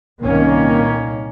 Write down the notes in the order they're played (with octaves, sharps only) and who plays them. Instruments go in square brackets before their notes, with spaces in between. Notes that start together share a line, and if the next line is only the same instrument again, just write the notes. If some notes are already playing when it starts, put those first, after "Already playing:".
[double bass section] C2 A#2 D#3 A#3 C#4